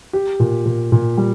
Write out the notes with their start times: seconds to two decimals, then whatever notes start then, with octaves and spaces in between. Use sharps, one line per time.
0.13 G4
0.40 A#2
0.65 A#2
0.92 A#2
1.17 G3